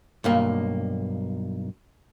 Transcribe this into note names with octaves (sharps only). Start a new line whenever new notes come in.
B1 G2 A#3